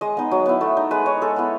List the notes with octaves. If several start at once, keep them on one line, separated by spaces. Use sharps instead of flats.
G#3 D#5
B3 D#4
F#3
B3 E4
A3
D#4
G#3 B4
D#4 C#5
G#3 A4
B3 E4